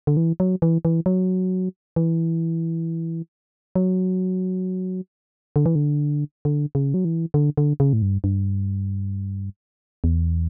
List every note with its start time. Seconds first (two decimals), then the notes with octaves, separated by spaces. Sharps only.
0.07 D3
0.17 E3
0.40 F#3
0.62 E3
0.85 E3
1.06 F#3
1.96 E3
3.76 F#3
5.56 D3
5.66 E3
5.75 D3
6.45 D3
6.75 C#3
6.94 F#3
7.05 E3
7.34 D3
7.58 D3
7.80 C#3
7.93 A2
8.02 G2
8.24 G2
10.04 E2